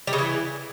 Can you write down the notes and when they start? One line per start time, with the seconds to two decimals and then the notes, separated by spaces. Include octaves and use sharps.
0.07 G3
0.13 C#3
0.18 E3